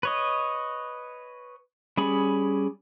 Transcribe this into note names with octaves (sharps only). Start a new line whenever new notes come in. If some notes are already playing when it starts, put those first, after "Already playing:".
B4 C#5 D#5
G3 C#4 G#4 B5